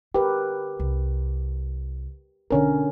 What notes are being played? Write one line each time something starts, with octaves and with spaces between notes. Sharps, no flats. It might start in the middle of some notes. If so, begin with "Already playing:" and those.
D3 G4 A#4 B4
C2
B1 D3 C#4 A#4